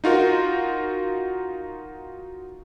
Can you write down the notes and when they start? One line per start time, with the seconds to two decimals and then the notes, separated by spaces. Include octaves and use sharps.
0.04 D#4 F4 F#4 A#4